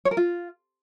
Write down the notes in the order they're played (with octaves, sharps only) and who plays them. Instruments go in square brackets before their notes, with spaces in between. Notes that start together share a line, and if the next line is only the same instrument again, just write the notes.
[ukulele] C#5
A#4
F4